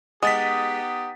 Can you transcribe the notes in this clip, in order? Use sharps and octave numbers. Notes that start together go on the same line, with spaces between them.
G#3 B3 D#4 G4 F#5 D#6 A6 B6